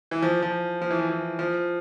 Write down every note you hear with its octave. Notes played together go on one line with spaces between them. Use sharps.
E3
F3
F3
F3
E3
F3
E3
F3